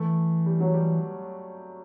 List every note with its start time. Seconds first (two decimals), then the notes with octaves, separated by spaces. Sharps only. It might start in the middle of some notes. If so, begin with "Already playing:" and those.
Already playing: E3 A3
0.46 G3
0.60 F#3
0.74 G3